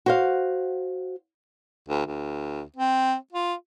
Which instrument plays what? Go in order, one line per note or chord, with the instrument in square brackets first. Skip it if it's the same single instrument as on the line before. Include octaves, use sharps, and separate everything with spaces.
[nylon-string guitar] F#4 C5 F5
[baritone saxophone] D2
D2
C4
F4